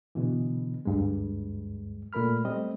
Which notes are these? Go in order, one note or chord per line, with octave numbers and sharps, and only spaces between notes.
B2 D3 E3
D2 G2 G#3
A#2 A3 A#4 B5 F6
G3 A3 C4 D#5